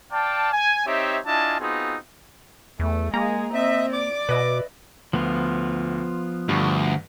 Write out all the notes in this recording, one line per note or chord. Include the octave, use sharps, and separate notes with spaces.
D5 F5 G5 A5
G#5
C4 D#4 G4 C#5 E5
D4 E4 F4 D#5 G#5 A5
B3 C4 D#4 F4 F#4 G#4
E2 A3
G#3 A#3 G#4 A#5
C4 D#5 E5
D5 D6
B2 B4 D#5 E5
D2 F3 B3 F4
D2 G2